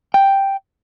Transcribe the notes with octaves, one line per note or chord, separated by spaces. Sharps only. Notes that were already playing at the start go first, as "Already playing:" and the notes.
G5